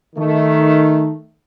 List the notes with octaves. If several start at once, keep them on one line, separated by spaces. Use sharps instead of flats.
D#3 A3